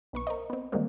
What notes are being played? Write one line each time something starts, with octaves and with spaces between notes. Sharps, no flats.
B1 B4 C#6
A#4 C5 D#5
B3 C4
D#3 E3 G3 G#3 A#3 C4